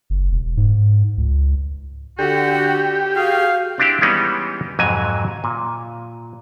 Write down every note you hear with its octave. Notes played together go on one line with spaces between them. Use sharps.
F#1
E1
G#2
C#2
D3 F#4 G4
F#4 G#4 F5
C4 D4 E4 G4
E3 G3 G#3 B3 C#4 D#4
F2 G#2 C3 F#3 G#5
A#2